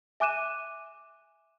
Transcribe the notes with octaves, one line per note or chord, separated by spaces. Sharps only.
E5 G#5 D6 F#6 D#7 E7